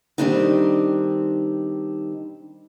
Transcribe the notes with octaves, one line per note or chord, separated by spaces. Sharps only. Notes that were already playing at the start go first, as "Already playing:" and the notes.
D#3 G3 G#3 C4 D4 D#4